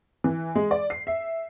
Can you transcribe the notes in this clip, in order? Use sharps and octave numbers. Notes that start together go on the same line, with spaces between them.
E3
G#3
D5
C7
E5